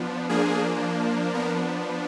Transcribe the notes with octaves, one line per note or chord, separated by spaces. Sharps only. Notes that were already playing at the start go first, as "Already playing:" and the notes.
Already playing: F3 B3 D4
F3 A#3 D4 G#4
F3 B3 D4 A#4